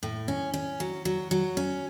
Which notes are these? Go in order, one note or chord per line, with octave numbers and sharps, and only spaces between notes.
A2
C#4
C#4
F#3
F#3
F#3
C#4